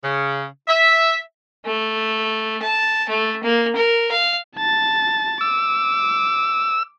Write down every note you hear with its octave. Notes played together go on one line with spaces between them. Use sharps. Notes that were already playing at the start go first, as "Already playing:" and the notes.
C#3
E5
A3
A5
A3
A#3
A#4
F5
A5 A6
D6 E6